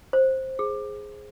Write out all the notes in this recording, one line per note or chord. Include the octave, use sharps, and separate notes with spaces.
C5
G#4